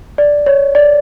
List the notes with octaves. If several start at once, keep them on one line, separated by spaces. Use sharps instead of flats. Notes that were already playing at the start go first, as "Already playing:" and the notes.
D5
C#5
D5